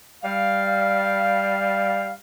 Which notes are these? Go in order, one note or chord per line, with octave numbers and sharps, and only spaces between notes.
G3 F5